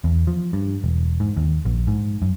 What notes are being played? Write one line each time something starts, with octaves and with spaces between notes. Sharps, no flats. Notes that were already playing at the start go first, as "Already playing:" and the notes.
E2
F3
G2
E1
G#2
D#2
A#1
G#2
F#2